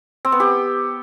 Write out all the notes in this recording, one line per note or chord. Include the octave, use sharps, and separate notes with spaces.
C4
B3
G4